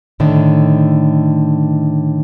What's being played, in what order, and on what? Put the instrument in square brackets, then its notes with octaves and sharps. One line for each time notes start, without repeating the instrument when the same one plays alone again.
[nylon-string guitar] A2 D3 D#3